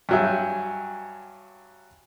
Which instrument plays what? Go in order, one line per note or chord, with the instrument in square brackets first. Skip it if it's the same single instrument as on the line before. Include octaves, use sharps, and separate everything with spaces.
[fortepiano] G2 F#3 E5 [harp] G5 G#5 G6